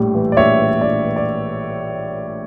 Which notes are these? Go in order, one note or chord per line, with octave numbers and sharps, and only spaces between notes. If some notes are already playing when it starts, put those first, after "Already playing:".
Already playing: A#1 A2 G3
E3
D5
A#1 C#5 E5
E3
A#1 D5
E3
D5